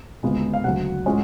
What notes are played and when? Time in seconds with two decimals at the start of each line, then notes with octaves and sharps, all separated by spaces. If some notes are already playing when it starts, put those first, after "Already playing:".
0.23 D2 C#3 G#3 B3 F4
0.54 F5
0.64 D2 C#3 F#3 C#4 F#5
1.06 A2 G#3 C#4 F4